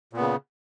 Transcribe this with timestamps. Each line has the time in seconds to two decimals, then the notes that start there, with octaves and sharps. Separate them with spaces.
0.13 A#2
0.16 B3
0.20 C#3